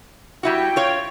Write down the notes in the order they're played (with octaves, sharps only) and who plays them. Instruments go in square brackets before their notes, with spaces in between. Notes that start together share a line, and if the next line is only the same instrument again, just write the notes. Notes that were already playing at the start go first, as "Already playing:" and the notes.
[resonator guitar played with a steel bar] G3 E4 F#4 [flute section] G5
[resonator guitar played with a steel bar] F4 C#5